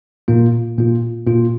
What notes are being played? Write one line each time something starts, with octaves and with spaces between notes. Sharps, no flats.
A#2 A#3 F4
A#2 A#3 F4
A#2 A#3 F4